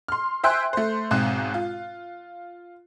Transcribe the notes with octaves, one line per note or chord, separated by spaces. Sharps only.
C6 F6
C5 E5 G5 G#5 C6 F#6
A3 C5
B1 G#2 C4 F#6
F4